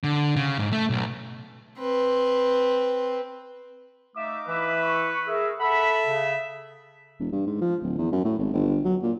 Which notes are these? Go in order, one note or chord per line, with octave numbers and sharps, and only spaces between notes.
D3
C#3
G#2
A3
B1
C4 B4
A3 D#4 E5 F5 D6
E3 E4 B4 E5
C#6
G#4 A#4 E5
A4 E5 F#5 B5
C#3
E1
G2
G#2
F3
D1
E2
F#2
A2
G#1
G1
F#3
A#2